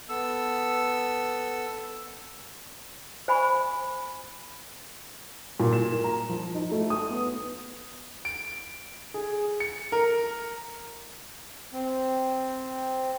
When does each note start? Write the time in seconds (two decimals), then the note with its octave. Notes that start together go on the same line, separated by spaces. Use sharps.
0.09 B3 A4 E6
3.28 C5 G#5 B5 C#6
5.60 A#2
5.73 E7
5.92 A#4
6.04 A#5
6.29 F3
6.55 D#4
6.71 A3
6.90 D#6
7.10 B3
8.25 D7
9.14 G#4
9.60 C#7
9.92 A#4
11.73 C4